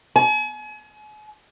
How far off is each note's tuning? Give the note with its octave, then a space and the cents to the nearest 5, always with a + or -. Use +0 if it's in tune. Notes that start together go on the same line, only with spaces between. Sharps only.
G#5 +40